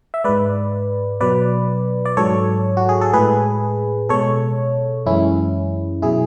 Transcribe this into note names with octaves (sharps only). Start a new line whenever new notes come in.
E5
G#2 G#3 B4 D5
B2 F#3 B4 D5
D5
G#2 F#3 A4 C#5
F#4
G#4
A4
A2 G#3 G#4 B4
B2 G#3 A4 C#5
F#2 E3 G#3 C#4 E4
B2 F#3 E4 G#4